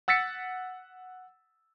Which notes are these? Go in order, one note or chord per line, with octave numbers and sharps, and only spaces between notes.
F#5 E6 A6 B6 C#7